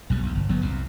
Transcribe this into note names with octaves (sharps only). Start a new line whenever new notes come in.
B1 B2 G3
B1 E2
G1
G1 F#3 B3
C2 F2 C3